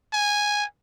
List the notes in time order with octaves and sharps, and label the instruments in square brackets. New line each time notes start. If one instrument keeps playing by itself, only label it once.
[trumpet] G#5